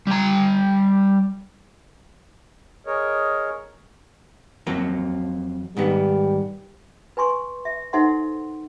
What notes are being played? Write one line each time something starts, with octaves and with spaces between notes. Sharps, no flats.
G3 A#5
G#4 A#4 C#5 D#5
F2 F#3 A#3
G#2 D#3 G3 B3
B4 G#5 C6 C#6
E5
D#4 A4 C5 E5 F#5 C6